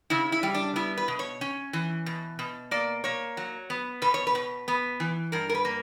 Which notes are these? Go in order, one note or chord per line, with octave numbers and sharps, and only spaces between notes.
C#3 E4
E4
G3
D4
B3 E4
B4
B2
C#5
C#4
E3
B2
B2
A#3 D5
A#3 C#5
F#3
B3
B2 B4
C#5
B4
B2
B3
E3
G2 A#4
A#4
B4
A#3